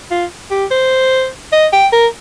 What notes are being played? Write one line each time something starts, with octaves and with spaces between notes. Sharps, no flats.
F4
G4
C5
D#5
G5
A#4